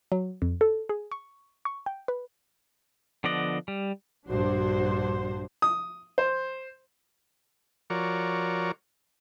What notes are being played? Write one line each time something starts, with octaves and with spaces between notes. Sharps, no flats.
F#3
F2
A4
G#4
C#6
C#6
G5
B4
D3 F3 B3 D5 D#5
G3
A#1 G2 D4 F#4 C5
D#6
C5
F3 F#4 A#4 C#5 D5